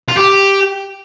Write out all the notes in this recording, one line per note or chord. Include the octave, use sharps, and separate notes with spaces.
F4
G4